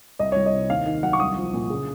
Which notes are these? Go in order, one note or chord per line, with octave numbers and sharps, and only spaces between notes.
C2 D#5
C2 C#5
D#5
C3
D#2 F5
D#3
F#3 F#5
C#6
C2 D#6
F3
A#2
C#3